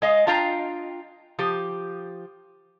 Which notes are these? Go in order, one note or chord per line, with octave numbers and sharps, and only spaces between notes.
G#3 D#5 F5
D4 F4 F5 G5 A#5
F3 G4